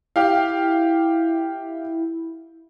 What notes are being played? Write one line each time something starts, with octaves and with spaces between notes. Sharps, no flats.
E4 G4 F5